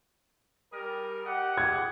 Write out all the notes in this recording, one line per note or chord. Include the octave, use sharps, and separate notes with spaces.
G3 G#4 A#4
G4 D#5 F#5
G#6